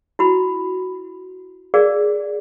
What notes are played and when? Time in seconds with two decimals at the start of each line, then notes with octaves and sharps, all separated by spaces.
0.19 E4 F#4 B5
1.74 G#4 A#4 D5 F5